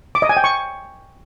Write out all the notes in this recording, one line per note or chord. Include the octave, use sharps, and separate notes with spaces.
D6
D#5
G#5
G5
C#6